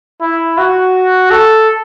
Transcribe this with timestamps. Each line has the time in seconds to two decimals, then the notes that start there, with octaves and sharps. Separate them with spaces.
0.21 E4
0.58 F#4
1.31 A4